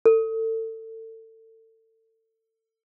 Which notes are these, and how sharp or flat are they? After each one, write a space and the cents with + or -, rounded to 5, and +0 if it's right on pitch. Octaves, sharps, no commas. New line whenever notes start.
A4 +30